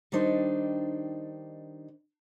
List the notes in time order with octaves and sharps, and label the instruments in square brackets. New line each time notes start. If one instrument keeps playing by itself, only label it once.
[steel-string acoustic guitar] D#3 G3 D4 D#4 C5 D5